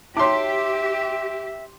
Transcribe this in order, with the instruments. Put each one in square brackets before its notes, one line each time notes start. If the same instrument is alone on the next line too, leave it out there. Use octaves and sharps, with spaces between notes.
[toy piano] D#4 F#4 C#5 [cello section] G4 [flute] E5 [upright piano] C6 D6